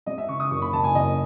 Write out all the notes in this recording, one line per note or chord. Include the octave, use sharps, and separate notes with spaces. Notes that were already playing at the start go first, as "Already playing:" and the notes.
G#3 D#5
E5
C#3 C#6
D#6
F#1 C#6
B5
F#1 A5
G#5
F#1 D#5